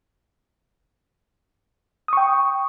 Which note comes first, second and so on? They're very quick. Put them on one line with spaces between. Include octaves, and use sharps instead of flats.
D#6 C#6 G5